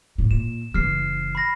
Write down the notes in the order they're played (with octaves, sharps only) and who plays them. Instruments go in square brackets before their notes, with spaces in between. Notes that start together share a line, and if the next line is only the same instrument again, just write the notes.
[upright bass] A2
[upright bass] A#2 [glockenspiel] E7
[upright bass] F#1 E3 [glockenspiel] F6 C7
[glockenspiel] B5 A#6